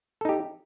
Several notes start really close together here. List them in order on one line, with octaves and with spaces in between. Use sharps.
A4 D#4 G4